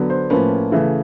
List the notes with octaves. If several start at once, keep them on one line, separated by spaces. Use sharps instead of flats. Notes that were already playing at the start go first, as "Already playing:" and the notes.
Already playing: D3 F#3 B3
C5
A2 F3 A#3 C#4 B4
C#3 E3 A3